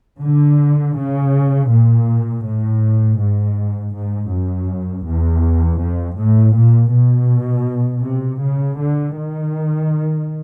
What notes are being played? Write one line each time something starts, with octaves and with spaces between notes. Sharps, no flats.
D3
C#3
A#2
A2
G#2
G#2
F#2
E2
F2
A2
A#2
B2
C3
C#3
D3
D#3